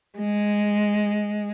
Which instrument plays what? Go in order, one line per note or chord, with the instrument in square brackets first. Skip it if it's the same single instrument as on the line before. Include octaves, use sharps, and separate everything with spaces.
[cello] G#3